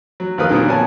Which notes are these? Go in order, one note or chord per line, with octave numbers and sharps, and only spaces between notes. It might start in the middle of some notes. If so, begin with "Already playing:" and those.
F#3
D#2 F3 A#4 B4 D#6
A#2 D3 D#3 F#3 A#3 B3
F2 B3 C#5 G#5 A5